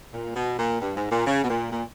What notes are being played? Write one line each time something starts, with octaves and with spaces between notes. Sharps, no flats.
A#2
B2
A#2
G2
G#2
A#2
C#3
B2
A#2
A#2